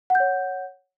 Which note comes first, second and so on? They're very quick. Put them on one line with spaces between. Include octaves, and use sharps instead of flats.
F#5 G6 C#5